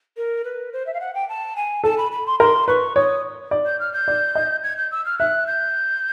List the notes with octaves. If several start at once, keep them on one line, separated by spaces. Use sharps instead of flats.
A#4
B4
C5
E5
F5
F#5
G5
A5
G#5
A4 A5
B5
B5
C6
A#4 C6
B4 C#6
C#5 D#6
D5
G6
F6
G6
D5
D#5
G#6
G6
E6
F6
E5 F#6
G6